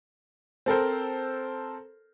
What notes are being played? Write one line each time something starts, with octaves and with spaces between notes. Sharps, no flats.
C4 A4 A#4 C5